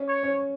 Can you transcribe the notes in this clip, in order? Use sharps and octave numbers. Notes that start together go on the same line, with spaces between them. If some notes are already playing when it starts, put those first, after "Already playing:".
Already playing: C#4
C#5
C#4